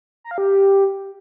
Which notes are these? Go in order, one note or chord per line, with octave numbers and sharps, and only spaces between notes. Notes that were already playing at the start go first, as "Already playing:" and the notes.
A#5
F5
G4